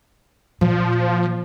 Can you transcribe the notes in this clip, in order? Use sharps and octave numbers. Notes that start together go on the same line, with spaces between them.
A#2 F3